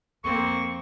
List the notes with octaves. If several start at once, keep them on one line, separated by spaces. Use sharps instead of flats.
F2 A#3 C4 C#6